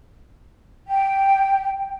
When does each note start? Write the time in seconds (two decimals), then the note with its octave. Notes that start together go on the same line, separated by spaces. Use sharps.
0.88 G5